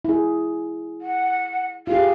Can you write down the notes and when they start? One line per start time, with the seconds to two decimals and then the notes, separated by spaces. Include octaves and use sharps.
0.05 E4 G#4
1.01 F#5
1.87 F4 G4 G#4 F5